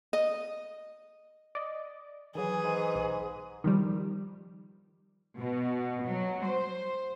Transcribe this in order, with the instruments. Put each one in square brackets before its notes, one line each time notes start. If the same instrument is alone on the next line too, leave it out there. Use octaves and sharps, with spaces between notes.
[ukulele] D#5
[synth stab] D5 D#5
[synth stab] D#3 F#3 [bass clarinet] E3 [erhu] G#4
[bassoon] G#2
[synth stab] B1
D#3 F3 G3
[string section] B2
F#3
C5